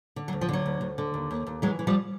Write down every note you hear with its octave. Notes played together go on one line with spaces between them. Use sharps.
D3
F#3
D2
F3
D3 F#3
D2
D2
D3
D#2
D#2
D#2
E3 F#3 G#3
E3
F3 G3